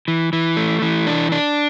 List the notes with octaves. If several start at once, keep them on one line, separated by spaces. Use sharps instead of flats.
E3
E3
A3
E3
D4
D4